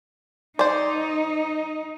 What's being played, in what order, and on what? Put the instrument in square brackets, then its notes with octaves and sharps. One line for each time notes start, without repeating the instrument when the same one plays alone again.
[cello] D#4 [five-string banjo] C5 D5